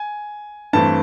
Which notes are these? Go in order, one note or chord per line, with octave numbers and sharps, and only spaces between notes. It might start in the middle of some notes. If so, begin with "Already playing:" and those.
Already playing: G#5
G2 E3 A3 C4 A5